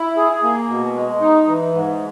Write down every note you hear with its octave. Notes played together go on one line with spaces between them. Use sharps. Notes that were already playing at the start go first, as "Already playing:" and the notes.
Already playing: E4
G#4
A#3
B2
G#3
D#4
E3
G#2